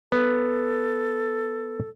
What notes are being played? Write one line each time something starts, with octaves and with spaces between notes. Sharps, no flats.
B3 A4